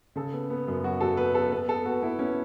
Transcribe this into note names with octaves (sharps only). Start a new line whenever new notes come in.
C#3 A4
B3
B3
F#2
F#3 F#4
F#3 A4
B3 B4
B3 A4
B3 B4
B3 A4
B3 F#4
B3 E4
B3 C#4